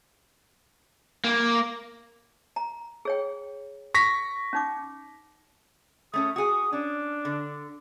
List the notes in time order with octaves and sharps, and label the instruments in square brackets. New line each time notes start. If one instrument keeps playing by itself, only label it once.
[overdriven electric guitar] A#3
[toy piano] A#5
G#4 C#5 G5
[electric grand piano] C#6 A#6 B6
[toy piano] C#4 D#4 D6
[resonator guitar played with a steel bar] A3 C#4 A4 [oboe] D#6
[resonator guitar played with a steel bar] F#4 G#4 [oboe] D#6
[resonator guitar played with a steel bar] C#4 [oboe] D4
[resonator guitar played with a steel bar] D3